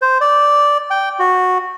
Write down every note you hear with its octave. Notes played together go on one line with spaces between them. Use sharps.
C5
D5
G5
F#4